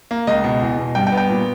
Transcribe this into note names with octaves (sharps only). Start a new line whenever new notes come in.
A#3
C#2 D#5
B2
E2
B2
G2 G5
G5
B3
G5
A#2